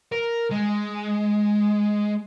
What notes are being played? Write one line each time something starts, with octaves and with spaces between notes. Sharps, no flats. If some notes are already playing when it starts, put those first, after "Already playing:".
A#4
G#3